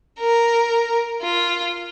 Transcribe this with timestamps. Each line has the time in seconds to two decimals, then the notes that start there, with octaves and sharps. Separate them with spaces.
0.19 A#4
1.22 F4